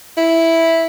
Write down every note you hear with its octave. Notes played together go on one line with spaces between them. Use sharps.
E4